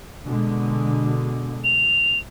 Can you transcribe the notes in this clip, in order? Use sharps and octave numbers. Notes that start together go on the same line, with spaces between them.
B2 D3 G#3
F7